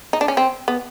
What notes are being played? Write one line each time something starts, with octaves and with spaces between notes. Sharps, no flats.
D#4
D4
C#4
C4
B3